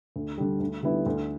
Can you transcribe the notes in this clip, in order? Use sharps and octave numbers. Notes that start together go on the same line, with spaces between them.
D2
D3 G3
D2
D3 G3 B3 E4
D2